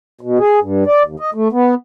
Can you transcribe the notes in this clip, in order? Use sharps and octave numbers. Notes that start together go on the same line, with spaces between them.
B2
G#4
G2
D5
D#2
D#5
A3
B3